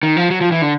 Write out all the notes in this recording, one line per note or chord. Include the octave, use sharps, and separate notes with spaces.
D#3
F3
F#3
F3
E3
D3